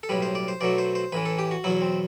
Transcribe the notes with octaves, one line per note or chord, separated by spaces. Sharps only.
A4
B1 A2 G3 B4
C5
D5
C5
B1 B2 F#3 A3 D5
C5
C5
A1 A2 E3 B4
A4
G4
F#4
E2 B2 F#3 E4
C4